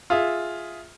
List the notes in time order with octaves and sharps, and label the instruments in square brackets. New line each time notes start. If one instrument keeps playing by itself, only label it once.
[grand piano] F4 G#4 E5